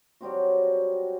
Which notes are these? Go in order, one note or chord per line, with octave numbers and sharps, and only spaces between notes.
F#3 G3 C4 F#4